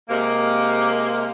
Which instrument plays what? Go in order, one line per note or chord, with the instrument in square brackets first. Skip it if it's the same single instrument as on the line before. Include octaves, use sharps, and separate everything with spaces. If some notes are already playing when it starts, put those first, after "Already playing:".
[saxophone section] C3 G#3 A#3